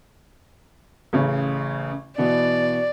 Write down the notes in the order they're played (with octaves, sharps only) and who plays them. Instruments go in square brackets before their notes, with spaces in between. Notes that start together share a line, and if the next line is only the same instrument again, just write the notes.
[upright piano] A1 C#3
[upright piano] B2 E3 B3 [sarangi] D5